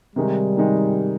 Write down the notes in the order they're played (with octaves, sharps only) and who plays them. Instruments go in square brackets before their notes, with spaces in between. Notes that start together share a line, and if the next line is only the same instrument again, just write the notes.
[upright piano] C3 D#3 G#3 D#4 [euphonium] G3
[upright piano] C3 D#3 G#3 D#4